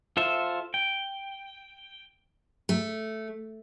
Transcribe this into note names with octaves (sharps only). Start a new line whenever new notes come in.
F4 A4 C5 E5
G5
A3